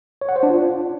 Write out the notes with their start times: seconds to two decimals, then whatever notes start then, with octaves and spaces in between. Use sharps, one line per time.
0.21 C#5
0.29 F#5
0.36 C5
0.43 D4
0.50 F4